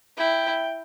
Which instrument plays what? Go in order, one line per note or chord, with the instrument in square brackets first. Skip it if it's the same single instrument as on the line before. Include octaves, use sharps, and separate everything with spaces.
[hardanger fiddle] E4 [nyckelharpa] G5